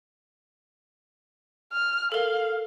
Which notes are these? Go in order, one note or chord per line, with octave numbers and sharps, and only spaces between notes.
F6
A4 A#4 F5